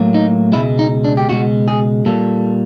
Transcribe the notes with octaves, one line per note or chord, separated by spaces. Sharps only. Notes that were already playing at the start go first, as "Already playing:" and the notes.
Already playing: A2 F#3 A#3
D#4
C#2 B2 G#3 E4
D#4
D4
G4
C#2 B2 G#3 F#4
G#4
A#2 G3 A#3 A4